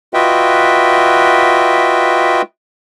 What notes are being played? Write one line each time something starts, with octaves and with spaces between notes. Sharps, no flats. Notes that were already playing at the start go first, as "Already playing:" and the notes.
F4 F#4 B4 D#5 E5 G5